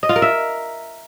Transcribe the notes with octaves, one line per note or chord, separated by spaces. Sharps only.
D#5
F4
A#4
E5